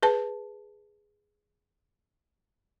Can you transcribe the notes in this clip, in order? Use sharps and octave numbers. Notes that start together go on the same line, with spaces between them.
G#4 B4 A5